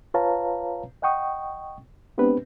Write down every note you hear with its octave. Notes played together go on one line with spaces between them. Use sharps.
F4 B4 C#5 F5 A5 A#5
D#5 F#5 G5 C#6 D#6
G#3 B3 C4 D4 G4 B4